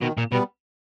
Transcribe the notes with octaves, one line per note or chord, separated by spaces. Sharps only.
B2 D#3
A#2
B2 G3 B3